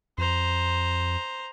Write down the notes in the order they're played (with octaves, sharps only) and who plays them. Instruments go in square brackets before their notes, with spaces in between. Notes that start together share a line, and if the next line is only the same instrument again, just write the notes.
[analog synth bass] F2 [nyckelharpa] C5 A#5